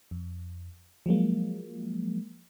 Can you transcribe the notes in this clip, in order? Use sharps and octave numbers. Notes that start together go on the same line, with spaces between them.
F2
F3 F#3 G#3 A#3